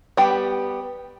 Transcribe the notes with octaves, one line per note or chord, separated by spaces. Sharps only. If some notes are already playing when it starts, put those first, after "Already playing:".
G3 B3 G4